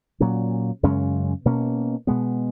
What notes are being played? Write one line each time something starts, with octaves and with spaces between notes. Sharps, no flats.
A#2 F#3 C#4
F#2 C#3 G#3 C#4
B2 A#3 C#4
B2 G#3 B3